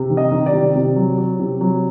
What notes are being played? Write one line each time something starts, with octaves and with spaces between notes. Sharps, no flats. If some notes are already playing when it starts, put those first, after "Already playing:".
Already playing: C3
D#3
D#5
D#3
D5
C3
C3 D5
F#3
F#3
C3
F#3